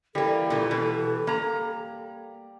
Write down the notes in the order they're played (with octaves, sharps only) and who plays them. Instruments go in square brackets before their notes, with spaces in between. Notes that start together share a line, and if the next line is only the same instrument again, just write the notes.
[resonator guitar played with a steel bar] E3 A#3 [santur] G3 [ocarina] A4
[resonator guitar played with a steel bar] A#2 E3
B2 E3
A#3 A#5